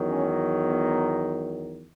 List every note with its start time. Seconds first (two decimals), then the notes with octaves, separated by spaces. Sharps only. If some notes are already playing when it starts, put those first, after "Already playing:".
Already playing: E2 D#3 F#3
0.09 C#4
0.68 B3